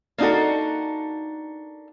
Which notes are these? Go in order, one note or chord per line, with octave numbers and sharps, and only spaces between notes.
A#3 D4 D#4 F#4 A4